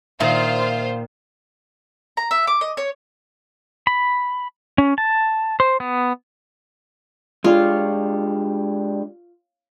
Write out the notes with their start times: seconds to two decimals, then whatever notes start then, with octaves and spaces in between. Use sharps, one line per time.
0.20 A#2 D#3 F4 C5 E5 F5
2.17 A#5
2.31 E5
2.47 D6
2.61 D#5
2.77 C#5
3.87 B5
4.78 C#4
4.98 A5
5.60 C5
5.80 B3
7.44 G#3 D4 F4 G4 C#5